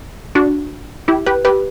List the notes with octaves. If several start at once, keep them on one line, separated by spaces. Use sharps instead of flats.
D4 F#4
E4 G4
G4 B4
G4 B4